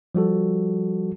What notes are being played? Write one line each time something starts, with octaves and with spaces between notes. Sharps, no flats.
F3 G3 F#4 A4